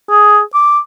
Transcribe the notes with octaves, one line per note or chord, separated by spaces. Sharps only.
G#4
D6